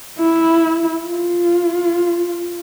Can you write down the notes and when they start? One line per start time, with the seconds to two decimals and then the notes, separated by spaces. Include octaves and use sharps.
0.19 E4
1.05 F4